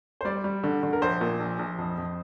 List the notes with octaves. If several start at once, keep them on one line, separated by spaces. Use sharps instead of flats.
C5
G3 D5
G3
D3
D3
A#4
A#1 C5
A#2
A#1
A#1
F2
F2